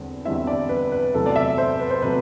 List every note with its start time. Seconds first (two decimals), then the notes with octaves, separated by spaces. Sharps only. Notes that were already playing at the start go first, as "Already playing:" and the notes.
Already playing: E2 D3 G3 C4
0.25 E2 D3 G3 C4 E4 E5
0.47 D5
0.69 B4
0.92 B4
1.14 E2 C3 F#3 A3 A4
1.26 D5
1.36 E5
1.58 C5
1.80 B4
1.91 C5
2.02 C3 F#3 A3 B4